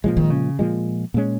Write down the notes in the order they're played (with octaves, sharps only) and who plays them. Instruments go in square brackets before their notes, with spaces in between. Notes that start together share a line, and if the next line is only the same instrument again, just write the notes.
[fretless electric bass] A#2 F3 G#3 [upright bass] C#3
[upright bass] D#3
C#3
[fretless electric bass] A#2 F3 G#3
A#2 G#3 C#4